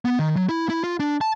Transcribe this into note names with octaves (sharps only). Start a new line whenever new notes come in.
B3
D#3
F#3
E4
E4
F4
D4
A5